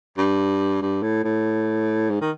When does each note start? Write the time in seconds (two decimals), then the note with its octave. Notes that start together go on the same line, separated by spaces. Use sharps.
0.18 G2
0.82 G2
1.02 A2
1.24 A2
2.10 G#2
2.21 D#3